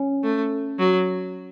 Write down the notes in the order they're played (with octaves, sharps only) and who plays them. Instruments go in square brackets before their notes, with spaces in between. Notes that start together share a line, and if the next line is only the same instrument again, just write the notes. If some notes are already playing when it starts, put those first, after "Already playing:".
Already playing: [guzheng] C#4
[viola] A3
F#3